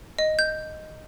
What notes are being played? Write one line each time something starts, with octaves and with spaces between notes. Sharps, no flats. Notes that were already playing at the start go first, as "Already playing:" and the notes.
D#5
G6